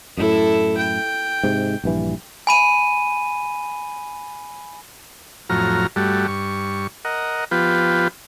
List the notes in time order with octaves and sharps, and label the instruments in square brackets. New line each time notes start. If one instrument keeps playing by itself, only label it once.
[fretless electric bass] F#2 A2 [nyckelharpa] E4 A4
[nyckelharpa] G5
[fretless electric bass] G#2 C3
A#1 G2 E3
[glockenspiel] G#5 B5 D#7
[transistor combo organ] F2 A2 F#3 A#5 F6
G2 G3 A3 F#4
G2 C#6
A#4 D#5 F#5
F3 B3 F4 G4 B4